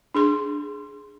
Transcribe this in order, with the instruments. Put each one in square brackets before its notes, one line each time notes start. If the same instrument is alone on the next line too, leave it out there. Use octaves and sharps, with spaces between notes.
[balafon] D4 G#4 C6